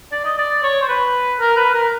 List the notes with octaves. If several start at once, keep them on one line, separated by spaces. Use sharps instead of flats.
D5
D#5
D5
C#5
C5
B4
A#4
B4
A#4